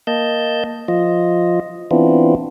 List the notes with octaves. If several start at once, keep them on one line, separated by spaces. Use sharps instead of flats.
A#3 D#5 A5 G6
F3 F4 D#5
E3 B3 C4 D4 E4 F4